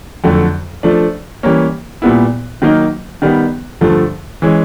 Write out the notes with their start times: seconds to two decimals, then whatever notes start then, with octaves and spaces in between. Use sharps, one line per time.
0.24 F2 D3 F#3 A3
0.83 F3 A3 D4
1.43 E3 G3 A#3 C#4
2.02 A#2 G3 B3 E4
2.62 D#3 F#3 A#3 D#4
3.22 D#3 G3 B3
3.81 G2 D3 F3 A3
4.42 E3 G#3 C#4